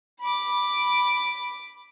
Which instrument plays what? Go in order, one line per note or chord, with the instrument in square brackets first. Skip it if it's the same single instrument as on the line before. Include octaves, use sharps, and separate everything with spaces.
[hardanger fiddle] B5 D6